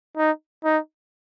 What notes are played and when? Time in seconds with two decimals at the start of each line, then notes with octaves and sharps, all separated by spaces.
0.17 D#4
0.64 D#4